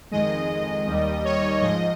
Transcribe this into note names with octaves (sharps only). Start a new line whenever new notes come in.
F2 D#3 G#3 D#5
D#2 D#3 G3
C#5
G#2 F3 G#3 D#5